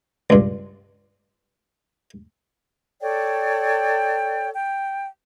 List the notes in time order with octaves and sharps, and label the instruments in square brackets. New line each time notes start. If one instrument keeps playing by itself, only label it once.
[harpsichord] C#2 G2
[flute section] A4 C#5 D5 G5
G5